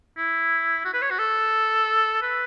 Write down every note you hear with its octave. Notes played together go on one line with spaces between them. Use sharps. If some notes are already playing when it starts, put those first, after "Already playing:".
E4
F#4
B4
C#5
F#4
A4
B4